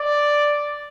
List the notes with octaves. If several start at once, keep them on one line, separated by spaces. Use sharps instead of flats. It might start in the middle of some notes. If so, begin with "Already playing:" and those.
Already playing: D5